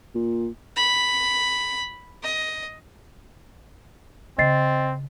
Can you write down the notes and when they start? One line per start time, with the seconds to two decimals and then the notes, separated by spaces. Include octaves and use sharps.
0.15 A#2
0.76 B5
2.23 D#5
4.38 C#3 C4 D#5 A6 C7